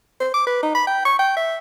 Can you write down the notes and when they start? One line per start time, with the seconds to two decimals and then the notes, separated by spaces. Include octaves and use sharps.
0.20 C5
0.34 D6
0.47 B4
0.63 D#4
0.75 B5
0.87 G5
1.05 C#6
1.19 G5
1.36 E5